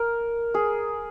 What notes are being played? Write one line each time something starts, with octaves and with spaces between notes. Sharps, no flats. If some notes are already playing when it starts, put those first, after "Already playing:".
Already playing: A#4
G#4